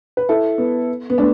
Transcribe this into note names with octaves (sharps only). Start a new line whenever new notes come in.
B4
E4 A4
B3
B3
A3 D4